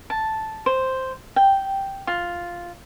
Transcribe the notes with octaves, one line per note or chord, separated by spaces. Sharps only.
A5
C5
G5
F4